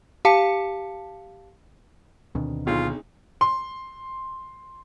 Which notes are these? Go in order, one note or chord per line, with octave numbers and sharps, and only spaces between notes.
G4 F5 A5 C#7
D2 B2 D#3 C4 D4
B1 D#4 F4 G#4
C6